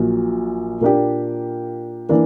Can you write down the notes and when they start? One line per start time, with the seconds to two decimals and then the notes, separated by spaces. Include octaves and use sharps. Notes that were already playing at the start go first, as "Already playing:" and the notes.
Already playing: A#1 A#2 F#3
0.81 A#2 A#3 D4 G4
2.09 E3 A#3 D4